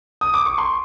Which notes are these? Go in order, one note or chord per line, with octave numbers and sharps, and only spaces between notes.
D#6
D6
C#6
C6